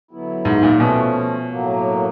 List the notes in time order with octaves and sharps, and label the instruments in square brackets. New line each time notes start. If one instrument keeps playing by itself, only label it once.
[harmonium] D3 F#3 B3 E4
[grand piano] G#2
A#2
[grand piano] B2 [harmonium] F3 A3 C#4
[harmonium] A2 F#3 A#3